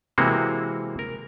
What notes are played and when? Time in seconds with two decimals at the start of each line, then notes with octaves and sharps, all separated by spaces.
0.18 C3 E3 G#3 A#3 C4 F#4
0.99 A#4